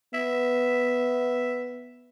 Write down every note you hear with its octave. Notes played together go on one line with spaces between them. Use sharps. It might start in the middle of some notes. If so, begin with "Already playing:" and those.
B3 E5